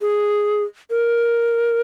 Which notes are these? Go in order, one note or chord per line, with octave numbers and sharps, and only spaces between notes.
G#4
A#4